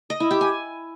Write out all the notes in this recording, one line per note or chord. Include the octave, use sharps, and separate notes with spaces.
D#5
E4
G4
G#5